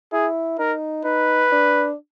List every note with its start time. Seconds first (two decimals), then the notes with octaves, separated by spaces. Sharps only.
0.12 E4 G#4
0.59 D#4 A#4
1.05 D#4 B4
1.52 D4